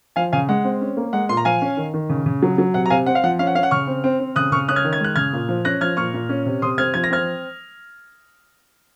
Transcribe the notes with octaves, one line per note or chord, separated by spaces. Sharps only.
F3 F5 G#5
C#3 F5 G#5
G#3 F#5
C4
C#4
A#3
G#3 F#5
A#2 C6
A#5
F3 F5 G#5
C#4
D#3
D#3
C#3
C#3
F#3
F#3
C3 F#5
A#5
C3 F5 G#5
C4 F#5
F5
F3 F#5
C#4 F5
F#5
C#4 F5
F#5
C#3 C#6 F6
C4
C4
C4
C#3 D#6 F#6
C#3 C#6 F6
C#4 D#6 F#6
F6 G#6
D#3
G#6
G#3 F#6
C#3 F6 G#6
A#2
F3
C#4 F#6 A#6
F3 F6 G#6
A#2 C#6 F6
A#2
C#4
C3
C3 C6 D#6
C4 F6 G#6
F3 G#6
A#6
C4 F6 G#6